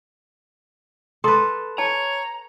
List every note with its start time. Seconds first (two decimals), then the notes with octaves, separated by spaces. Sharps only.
1.24 A4 B4 A#5 C6 D#6
1.78 C#5 A5 A#5